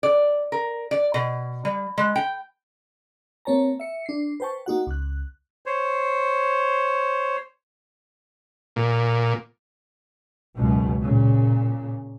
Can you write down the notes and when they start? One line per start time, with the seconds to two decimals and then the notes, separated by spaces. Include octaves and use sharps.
0.03 D5
0.52 A#4
0.91 D5
1.14 B2
1.65 G3
1.98 G#3
2.16 G5
3.45 A#3 C4 C#5 A5 A#5
3.80 E5 C#7
4.06 D4 C7
4.40 B4 C5 G5 A5 C#6
4.66 A#3 D#4 F#4 F#5
4.87 C#2 F#6
5.66 C5 C#5
8.76 A#2
10.56 C#2 F#2 B2
11.02 A#2 C#3